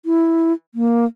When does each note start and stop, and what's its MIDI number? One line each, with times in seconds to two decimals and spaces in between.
0.05 0.53 64
0.75 1.05 58